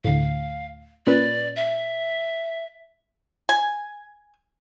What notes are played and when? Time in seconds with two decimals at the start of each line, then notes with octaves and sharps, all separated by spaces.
0.04 D2 A2 F5
1.07 A#2 C#4 B4 D5
1.56 E5
3.49 G#5